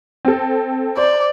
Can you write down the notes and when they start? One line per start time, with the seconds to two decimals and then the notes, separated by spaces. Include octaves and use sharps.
0.25 C4 A4
0.97 C5 D5